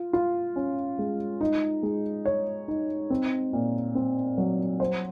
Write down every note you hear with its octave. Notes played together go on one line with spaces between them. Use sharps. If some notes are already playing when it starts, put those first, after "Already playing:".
Already playing: F4
F4
C#4
G#3
D#4
G#3
C#5
D#4
C4
A#2
C4
F#3
C5